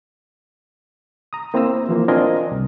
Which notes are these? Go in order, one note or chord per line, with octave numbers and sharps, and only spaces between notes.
A#5 D#6
A#3 C4 E4 C5 A#5 E6
E3 F3 A#3
C4 D4 F4 A#4 D#5 G#5
C2